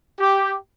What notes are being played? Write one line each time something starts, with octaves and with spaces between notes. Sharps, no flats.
G4